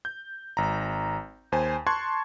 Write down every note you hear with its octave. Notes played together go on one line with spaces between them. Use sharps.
G6
G#1 A#5
D#2 C5 G#5
A5 C6 C#6 F#6 G#6